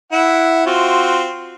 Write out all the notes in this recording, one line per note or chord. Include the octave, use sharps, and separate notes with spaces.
E4 F#5
C4 F4 F#4